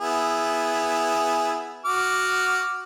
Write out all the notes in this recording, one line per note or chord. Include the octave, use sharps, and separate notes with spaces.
B3 E4 G#4
F#4 D6 F6